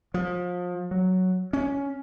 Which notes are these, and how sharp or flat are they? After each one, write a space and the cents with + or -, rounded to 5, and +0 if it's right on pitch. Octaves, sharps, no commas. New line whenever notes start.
F3 +30
F#3 +0
C#4 +10